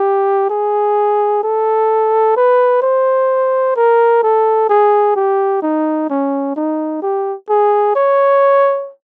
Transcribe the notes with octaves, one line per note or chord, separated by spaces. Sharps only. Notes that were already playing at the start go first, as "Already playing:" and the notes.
Already playing: G4
G#4
A4
B4
C5
A#4
A4
G#4
G4
D#4
C#4
D#4
G4
G#4
C#5